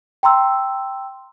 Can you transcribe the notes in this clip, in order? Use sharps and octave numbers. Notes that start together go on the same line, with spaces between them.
G5 A#5 C6 E6